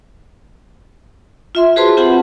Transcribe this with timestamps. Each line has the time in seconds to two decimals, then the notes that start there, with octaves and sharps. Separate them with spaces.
1.55 F4 E5 C6
1.76 F#4 G#4 B4 C5 A5 C6
1.97 C4 F4 G4 F#5 A5 B5